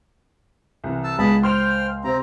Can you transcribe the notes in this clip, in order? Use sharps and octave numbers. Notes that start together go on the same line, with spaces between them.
C2 E3
A5 E6
C#2 B3 G#4 A5 B5
C5 G5 C6 F6 G6 F7
C3 C4 A#5